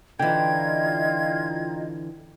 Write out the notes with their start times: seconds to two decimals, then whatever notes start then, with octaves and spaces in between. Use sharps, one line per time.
0.19 D3 E3 D#4 F4 D#5 G5 G#6